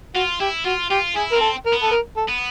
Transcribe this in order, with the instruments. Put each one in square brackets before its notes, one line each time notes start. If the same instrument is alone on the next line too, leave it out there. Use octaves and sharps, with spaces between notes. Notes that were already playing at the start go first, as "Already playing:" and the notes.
[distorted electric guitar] F4 [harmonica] F#4
[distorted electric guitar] E4 [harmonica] G4
[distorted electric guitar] F4 [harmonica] F#4
[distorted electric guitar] F4 [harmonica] G4
[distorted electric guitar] E4 [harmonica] G#4
[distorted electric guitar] C4 [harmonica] A#4
[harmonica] A4
A#4
[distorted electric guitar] B3
[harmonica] A4
A#4
A4
[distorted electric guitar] B3